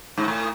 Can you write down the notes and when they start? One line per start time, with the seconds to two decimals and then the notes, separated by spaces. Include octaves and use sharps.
0.17 G#2
0.28 A2